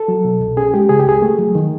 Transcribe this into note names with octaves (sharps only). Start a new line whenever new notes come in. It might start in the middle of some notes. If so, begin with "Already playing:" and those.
Already playing: A4
F#3
B2
C2
C#4 G#4
G#3 G4
C#3 G#4
G4
C#2 G#4
A3
F#3
D#3